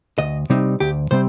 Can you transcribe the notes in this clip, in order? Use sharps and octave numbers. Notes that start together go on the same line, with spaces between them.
D2 D#5
C3 G3 C4 D#4
D2 G4
C3 G3 C4 C5